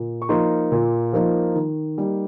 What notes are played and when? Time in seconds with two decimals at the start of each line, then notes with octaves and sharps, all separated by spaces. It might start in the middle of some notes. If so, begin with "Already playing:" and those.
Already playing: A#2
0.22 C#6
0.29 F3 A#3 D#4 C6
0.72 A#2
1.13 F3 A#3 D#4
1.55 D#3
1.98 G3 A#3 D#4